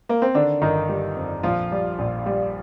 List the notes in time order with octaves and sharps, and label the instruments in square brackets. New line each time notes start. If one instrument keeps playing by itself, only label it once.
[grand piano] A#3
C4
D3 D#3 D4
G1 D#3 D#4
G3
F2
A#1 F3 F4
G3
A#1
G3